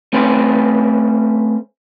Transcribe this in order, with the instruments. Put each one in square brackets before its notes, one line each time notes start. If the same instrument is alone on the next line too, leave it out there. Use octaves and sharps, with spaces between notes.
[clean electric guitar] A3 C4 C#4 B4 C5